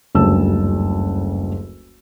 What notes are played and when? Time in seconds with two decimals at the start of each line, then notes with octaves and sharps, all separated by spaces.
0.15 F#1 D2 G2 C#3 A5 E6